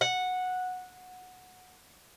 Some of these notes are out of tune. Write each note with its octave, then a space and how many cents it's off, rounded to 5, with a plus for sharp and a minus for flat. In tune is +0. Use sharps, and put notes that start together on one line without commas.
F#5 -10